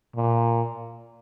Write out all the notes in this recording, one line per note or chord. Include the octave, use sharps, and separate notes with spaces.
A#2